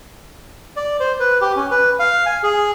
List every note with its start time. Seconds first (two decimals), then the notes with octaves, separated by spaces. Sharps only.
0.76 D5
1.00 C5
1.20 B4
1.41 G4
1.56 C#4
1.71 B4
1.99 F5
2.26 G#5
2.43 G#4